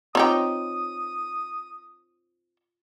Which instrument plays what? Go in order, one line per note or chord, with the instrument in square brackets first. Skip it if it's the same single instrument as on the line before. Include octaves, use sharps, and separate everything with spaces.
[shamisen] C4 D#4 G4 [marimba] F4 C#5 A#5 [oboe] D#6